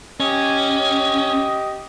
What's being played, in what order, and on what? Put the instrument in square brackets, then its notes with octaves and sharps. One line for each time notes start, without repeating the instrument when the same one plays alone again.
[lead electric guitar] C#4 [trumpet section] G4 D#5